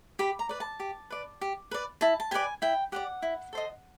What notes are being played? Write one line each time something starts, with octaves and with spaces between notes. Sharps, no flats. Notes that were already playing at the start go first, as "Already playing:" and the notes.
G4 B5
A#5
B4 D5
A5
G4
B4 D5
G4
B4 D5
E4 A5
A5
G4 B4 D5 G#5
E4 G5
G4 B4 D5 F#5
E4
A4 C5 D#5